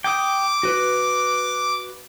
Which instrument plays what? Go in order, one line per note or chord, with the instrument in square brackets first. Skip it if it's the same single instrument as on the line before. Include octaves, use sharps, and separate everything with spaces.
[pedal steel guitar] G5 D#6 [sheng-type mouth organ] D6
[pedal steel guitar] F#4 B4